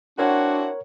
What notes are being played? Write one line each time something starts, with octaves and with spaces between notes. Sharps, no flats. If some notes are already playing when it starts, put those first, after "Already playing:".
C4 D4 E4 F#4 A#4 C#5 F#5